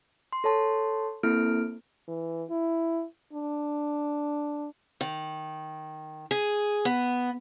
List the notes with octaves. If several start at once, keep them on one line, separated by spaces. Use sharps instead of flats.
C6
A4 C#5 A5 C6
A#3 C4 E4 A4 F6 D7
E3
E4
D4
D#3
G#4
B3